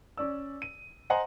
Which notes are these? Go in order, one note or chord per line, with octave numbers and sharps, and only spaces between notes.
C#4 D5 E6
D#7
C5 D#5 F#5 G#5 A#5 C6